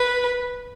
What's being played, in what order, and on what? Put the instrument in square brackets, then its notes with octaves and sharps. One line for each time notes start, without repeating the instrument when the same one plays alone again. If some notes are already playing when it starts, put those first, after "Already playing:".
Already playing: [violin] B4